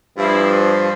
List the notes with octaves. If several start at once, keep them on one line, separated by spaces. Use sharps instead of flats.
G2 F3 E4